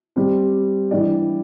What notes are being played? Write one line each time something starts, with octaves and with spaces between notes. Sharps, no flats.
G3 C4 G4
E3 G3 D4 G4 D5